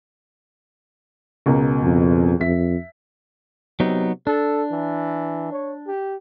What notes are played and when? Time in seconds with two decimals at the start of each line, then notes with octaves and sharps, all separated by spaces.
1.46 C#2 B2 A#4
1.83 F2
2.40 F2 E5 B6
3.80 C3 F#3 B3 D#4
4.27 D4 A4
4.72 E3
5.52 C#5
5.87 G4